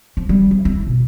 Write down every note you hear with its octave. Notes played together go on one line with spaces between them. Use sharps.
F3
G3
F3
E4
B2